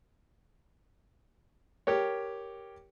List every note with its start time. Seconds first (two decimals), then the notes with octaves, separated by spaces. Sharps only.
1.87 G4 A#4 C#5